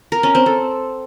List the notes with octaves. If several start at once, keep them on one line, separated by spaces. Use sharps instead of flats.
A#4
C#4
C4
A4